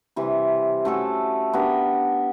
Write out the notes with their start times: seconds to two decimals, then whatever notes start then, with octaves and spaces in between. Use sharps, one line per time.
0.16 C3 E3 G3
0.85 A3 C#4 F#4 A4
1.53 B3 D4 G4 A#4